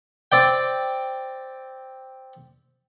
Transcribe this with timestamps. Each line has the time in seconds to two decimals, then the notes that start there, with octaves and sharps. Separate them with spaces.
0.32 C4 D5 G5